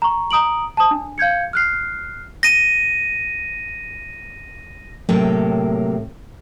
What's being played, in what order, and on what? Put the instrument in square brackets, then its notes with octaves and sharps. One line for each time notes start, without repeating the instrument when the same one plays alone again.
[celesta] A#5 C#6
A#5 D#6 D7 F#7
A5 D#6
D4
F5 G6 G#6 C#7
F6 F#6 C7
[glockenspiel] A#6 D#7
[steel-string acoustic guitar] A2 C3 F#3 A#3 G5